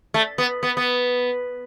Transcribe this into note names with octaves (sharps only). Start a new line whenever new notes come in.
A3
B3
B3
B3